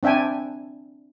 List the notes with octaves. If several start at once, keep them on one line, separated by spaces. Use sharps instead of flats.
C4 D4 E5 G5 G#5